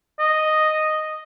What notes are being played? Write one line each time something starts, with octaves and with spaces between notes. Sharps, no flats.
D#5